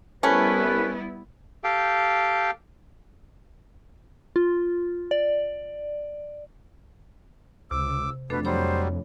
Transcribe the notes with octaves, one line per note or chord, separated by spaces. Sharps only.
C2 G3 A3 B3 C#4 E4 B4
G4 A4 F5 G5
F4
D5
C#2 C3 D6 E6
F2 B2 A3 D4 A4 B4
F#3 G3 C5 C#5 B5